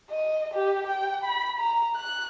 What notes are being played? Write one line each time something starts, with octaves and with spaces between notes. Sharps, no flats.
D#5
G4
G5
B5
A#5
F#6